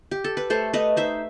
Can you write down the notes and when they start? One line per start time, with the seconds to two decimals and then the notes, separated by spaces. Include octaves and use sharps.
0.11 G4
0.24 A4
0.37 B4
0.50 A3 A4 C5
0.74 A3 B4 D#5
0.97 D#4 C5 E5